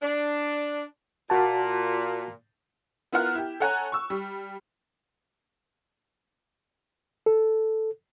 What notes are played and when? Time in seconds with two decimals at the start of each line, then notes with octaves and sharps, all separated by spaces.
0.02 D4
1.30 A#2 F#4 A5
3.12 B3 E4 F4 A#4 F#5 F6
3.35 E4 G4
3.60 A4 C#5 F#5 G#5 A#5 F#6
3.92 C#6 E6
4.10 G3
7.26 A4